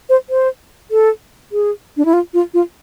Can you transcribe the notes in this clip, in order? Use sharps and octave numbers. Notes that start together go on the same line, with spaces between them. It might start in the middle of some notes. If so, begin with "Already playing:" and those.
C5
C5
A4
G#4
D4
E4
F4
F4
F4